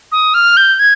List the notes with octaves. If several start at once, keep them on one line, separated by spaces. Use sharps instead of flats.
D#6
F6
G6
G#6